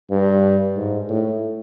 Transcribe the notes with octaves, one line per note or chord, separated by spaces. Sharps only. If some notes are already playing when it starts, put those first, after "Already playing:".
G2
G#2
A2